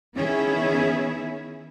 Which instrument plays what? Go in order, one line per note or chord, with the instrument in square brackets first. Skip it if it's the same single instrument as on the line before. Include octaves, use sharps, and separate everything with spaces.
[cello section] D#3 B3 C#4 E4 G#4 E5